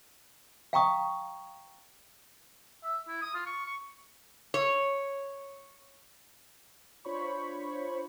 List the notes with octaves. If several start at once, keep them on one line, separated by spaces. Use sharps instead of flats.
F5 G5 A#5 C#6 D#6
E5
E4
D#6
F4
C#6
C#6
C#5
D4 F4 C5 C#5 B5 C#6